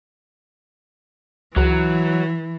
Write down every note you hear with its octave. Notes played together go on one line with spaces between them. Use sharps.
C#2 E3 F#3